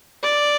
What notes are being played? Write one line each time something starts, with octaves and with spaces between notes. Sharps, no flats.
D5